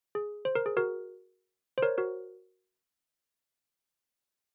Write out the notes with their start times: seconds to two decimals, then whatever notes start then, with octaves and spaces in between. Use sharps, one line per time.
0.15 G#4
0.45 C5
0.55 A#4
0.66 G#4
0.77 F#4 A#4
1.78 C5
1.82 A#4 C#5
1.98 F#4 A#4